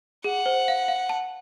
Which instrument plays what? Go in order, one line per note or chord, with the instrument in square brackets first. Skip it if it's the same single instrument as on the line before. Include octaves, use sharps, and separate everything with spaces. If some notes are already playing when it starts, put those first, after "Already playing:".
[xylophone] G#4 [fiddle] F#5
[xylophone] C5
F5
F5
A5